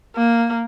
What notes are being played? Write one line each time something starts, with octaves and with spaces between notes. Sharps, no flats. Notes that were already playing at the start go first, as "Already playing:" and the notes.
A#3